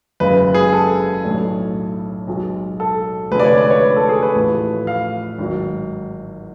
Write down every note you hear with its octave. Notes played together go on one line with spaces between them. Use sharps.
F#1 F#2 C#3 G#3 B4
B4
G#4
A4
B1 A2 F#3 A3 D4
B1 B2 G#3
A4
F1 F2 D3 G#3 B4
D5
C#5
D5
B4
C#5
B4
A4
G#4
B4
A1 A2 F3 A3
F5
G#1 G#2 F#3